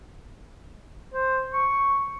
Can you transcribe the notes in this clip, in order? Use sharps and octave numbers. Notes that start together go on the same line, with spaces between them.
C5
C#6